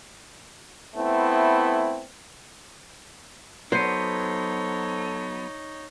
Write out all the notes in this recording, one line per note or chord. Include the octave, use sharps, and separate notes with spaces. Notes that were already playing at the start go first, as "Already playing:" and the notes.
A3 B3 C4 E4
F#3 B3 D#4 A4 C5 C#5